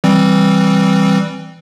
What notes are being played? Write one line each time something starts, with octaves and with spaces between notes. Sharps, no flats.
E3 G3 C4